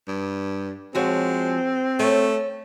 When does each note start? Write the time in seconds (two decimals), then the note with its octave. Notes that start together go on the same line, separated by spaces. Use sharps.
0.08 G2
0.95 F3 G#3 C4 F#4 C#5
1.99 A3 C#4